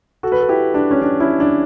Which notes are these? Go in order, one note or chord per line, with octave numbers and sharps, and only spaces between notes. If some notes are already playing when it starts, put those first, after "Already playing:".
F#4 A4
B4
A4
E4 G4
D4
C#4
D4
C#4 E4
D4